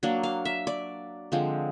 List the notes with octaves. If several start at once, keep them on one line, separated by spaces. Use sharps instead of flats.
F#3 A#3 D4
F5
E5
D5
D3 F3 G#3 C4